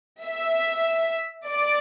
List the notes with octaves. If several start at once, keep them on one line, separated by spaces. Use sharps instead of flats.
E5
D5